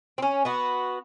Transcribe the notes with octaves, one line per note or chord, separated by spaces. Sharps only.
C4 C#4
B3 F#4